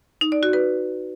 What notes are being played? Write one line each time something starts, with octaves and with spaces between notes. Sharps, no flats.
D#4
D5
F#4
B4